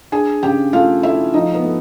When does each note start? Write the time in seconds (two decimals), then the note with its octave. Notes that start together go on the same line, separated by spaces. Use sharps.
0.12 D4 G#4 G#5
0.43 C#3 G4 G5
0.73 A3 F4 F5
1.03 A3 E4 E5
1.34 F3 D#4 D#5
1.54 B3 B4
1.64 A3